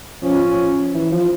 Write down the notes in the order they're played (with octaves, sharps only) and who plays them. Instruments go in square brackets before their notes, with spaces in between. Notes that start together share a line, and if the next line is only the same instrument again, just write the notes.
[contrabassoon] F3 [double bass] C#4
[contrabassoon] E3
F3